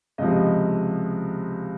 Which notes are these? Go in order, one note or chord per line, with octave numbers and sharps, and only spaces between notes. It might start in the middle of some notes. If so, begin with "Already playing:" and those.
C#2 C3 F3 D#5